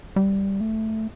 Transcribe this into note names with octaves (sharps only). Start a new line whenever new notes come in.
G3
A3